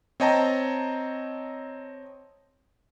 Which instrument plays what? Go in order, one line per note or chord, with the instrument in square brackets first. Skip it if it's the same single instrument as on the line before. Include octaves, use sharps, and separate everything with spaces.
[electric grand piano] C4 C#5 D#5 G5 A5 A#5